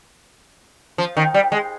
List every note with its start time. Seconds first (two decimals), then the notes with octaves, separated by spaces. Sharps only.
0.98 F3
1.17 D#3
1.34 G3
1.52 G#3